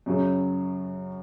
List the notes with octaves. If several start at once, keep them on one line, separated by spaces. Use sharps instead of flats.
F#2 C#3 F#3